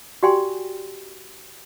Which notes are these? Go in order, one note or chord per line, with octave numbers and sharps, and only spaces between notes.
F#4 G4 D5 G5 G#5 C6